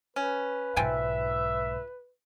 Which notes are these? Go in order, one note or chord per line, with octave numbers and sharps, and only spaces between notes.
C#4 B4
B1 G#2 F3 E5 G5 G#5